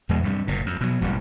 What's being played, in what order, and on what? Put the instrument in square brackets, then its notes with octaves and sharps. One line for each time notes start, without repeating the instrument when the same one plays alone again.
[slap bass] E2 B2 G#3
G2 C3 G3
F#1 A#2
F2
B2 F#3
E1 A1 F2 G3